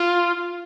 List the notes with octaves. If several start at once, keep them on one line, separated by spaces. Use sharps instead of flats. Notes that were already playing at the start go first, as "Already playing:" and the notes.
Already playing: F4